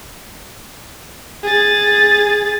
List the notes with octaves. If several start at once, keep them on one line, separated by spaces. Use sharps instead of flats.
G#4 A6